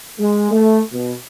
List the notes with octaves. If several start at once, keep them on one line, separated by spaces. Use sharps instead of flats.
G#3
A3
B2